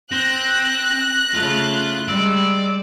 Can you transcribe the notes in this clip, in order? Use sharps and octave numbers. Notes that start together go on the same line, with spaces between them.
C4 F#6 A#6
C#3 A3 F4
G3 G#3 D5 E6